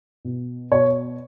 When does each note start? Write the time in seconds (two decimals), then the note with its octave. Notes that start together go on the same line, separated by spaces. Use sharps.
0.25 B2
0.72 B2 C#5